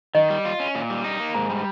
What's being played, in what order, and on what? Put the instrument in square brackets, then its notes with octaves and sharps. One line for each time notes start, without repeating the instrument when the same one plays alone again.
[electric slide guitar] D#3 [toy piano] D#5
[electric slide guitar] G3
F4
C#4
A#2
G3
D#4
A#3
[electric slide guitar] G#2 [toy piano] A#5
[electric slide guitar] G3